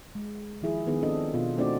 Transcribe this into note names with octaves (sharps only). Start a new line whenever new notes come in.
G#3
D#3 F3 E4 G#4
D#3 B3 F4 G#4
C4 D4 F4 G#4 A4 D#5
B2 F4
A3 C4 D4 D#4 F#4 D5